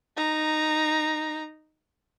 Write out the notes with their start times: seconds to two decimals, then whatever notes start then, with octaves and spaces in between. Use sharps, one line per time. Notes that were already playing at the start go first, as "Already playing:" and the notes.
0.17 D#4 A#5